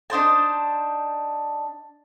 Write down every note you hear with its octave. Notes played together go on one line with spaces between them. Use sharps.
D4 D#4 C5 A5